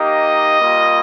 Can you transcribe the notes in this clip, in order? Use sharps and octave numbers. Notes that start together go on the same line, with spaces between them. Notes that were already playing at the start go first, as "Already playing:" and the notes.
Already playing: A#3 D#4 G4 D#5
G3 A#3 F4